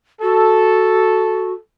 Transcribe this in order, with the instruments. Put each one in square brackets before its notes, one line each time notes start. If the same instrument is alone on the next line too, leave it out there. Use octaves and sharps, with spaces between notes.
[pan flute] F#4 [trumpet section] A4